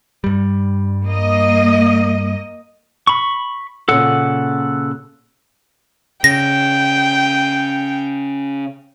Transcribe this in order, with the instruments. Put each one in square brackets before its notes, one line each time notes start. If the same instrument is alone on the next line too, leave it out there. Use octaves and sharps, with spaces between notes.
[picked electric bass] G2 G3
[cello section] A#3 D#5
[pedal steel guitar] B5 C#6
[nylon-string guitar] A#2 C#3 [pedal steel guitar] A4 F#5
[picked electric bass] C#3 [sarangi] G5 [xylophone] A#6